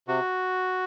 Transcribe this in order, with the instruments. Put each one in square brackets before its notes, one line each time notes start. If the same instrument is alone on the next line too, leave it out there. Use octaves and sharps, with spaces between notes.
[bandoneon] C3 F#4